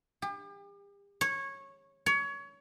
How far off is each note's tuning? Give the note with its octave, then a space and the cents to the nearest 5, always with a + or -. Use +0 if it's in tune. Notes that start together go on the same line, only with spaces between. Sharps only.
G4 +40
C#5 -15
C#5 +25